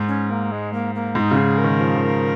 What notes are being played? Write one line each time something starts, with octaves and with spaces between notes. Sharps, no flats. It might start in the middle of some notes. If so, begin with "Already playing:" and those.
Already playing: G#2
C#4
A#3
G#3
A#3
A#3
G#2 D#4 F4
C#3
G#4
A#4
D#3
F3
D#3